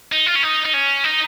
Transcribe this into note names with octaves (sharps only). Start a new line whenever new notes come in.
D#4
F4
C#4
D#4
D#4
C#4
D#4